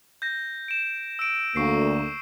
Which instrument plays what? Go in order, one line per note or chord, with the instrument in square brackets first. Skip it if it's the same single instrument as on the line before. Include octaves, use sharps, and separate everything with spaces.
[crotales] G6 A#6
D7 E7
E6 D7
[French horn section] D2 A#3 [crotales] C#6 C7